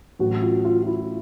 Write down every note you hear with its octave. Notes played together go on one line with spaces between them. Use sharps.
A1 A2 F#3 F#4
F4
F4
F4
E4